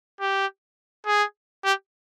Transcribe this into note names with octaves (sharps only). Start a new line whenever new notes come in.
G4
G#4
G4